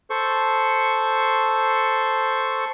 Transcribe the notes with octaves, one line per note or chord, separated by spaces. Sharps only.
A4 C5 C#6